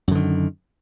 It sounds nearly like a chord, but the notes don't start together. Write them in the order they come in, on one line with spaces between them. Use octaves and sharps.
F#2 D3 D#3